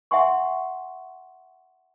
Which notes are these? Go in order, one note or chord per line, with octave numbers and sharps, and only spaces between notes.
E5 F#5 G#5 C6 C#6